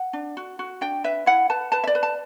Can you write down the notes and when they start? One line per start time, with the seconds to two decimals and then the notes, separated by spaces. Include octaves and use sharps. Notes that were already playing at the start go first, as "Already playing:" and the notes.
Already playing: F#5
0.13 D4
0.37 F#4
0.59 F#4
0.81 D4 G5
1.04 B4 E5
1.26 E4 F#5
1.50 B4 A5
1.72 B4 A5
1.84 E5
1.87 D5
1.95 B4
2.03 A5